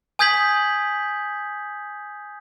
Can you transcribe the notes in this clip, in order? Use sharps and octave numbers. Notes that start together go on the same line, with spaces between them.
G#5 D#6 G6 G#6 B6 F#7